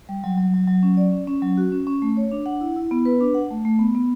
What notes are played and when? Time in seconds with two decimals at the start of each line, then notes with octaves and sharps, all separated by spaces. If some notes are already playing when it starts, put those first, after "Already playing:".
0.09 G3
0.24 F#3
0.38 F#3
0.54 F#3
0.68 F#3
0.83 C#4
0.97 D5
1.12 C#4
1.27 C#4
1.42 F#3
1.57 F#4
1.72 C#4
1.87 C#4
2.02 A3
2.17 C#5
2.31 D4
2.46 F#5
2.61 E4
2.76 E4
2.91 B3
3.05 B4
3.21 D4
3.34 F#5
3.50 A3
3.65 A3
3.79 B3
3.95 B3